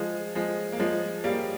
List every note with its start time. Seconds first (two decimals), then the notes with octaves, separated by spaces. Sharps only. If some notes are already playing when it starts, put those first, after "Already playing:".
Already playing: F3 G#3
0.35 F3 G#3
0.72 A#3
0.80 F3 G#3
1.24 G3 A#3